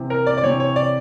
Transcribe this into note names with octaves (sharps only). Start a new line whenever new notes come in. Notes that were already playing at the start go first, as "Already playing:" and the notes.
Already playing: C3 E3
A#4
D5
D5
C3 E3 C#5
C#5
D5